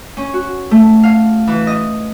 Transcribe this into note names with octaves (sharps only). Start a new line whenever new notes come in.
C#4
F#4
A3
F5
E3
D#5